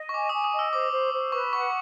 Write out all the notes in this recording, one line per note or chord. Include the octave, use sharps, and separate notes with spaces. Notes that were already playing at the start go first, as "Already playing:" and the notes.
Already playing: D#5
C#6
G#5 D6
G#5 D#6
D#6
D#5
E6
C5 D6
C5
C5
B4 C#6
F#5 C#6